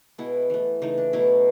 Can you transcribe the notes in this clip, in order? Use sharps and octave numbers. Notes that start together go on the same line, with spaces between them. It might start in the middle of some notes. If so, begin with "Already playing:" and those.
B2 G#3 B3 E4
E3 A3
C#3 E3 A3 D#4
D4
B2 F#3 A3 E4